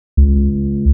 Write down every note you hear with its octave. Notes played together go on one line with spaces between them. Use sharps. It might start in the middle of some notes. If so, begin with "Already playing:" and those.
C#2